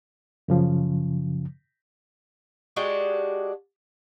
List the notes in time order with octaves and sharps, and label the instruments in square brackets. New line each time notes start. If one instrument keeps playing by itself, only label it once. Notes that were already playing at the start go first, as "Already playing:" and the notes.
[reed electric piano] F#2 C#3 F3
[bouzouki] G#3 D4 F#4 G4